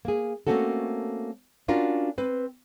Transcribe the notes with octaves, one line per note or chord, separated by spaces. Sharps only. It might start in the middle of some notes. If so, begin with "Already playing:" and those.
A#3 G#4
A3 A#3 C4 C#4 F#4 A4
C#4 D4 F4 F#4 A#4
C4 B4